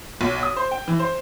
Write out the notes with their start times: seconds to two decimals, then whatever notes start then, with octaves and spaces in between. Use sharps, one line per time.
0.21 B1
0.43 D#6
0.57 C5
0.71 G5
0.88 E3
0.99 C5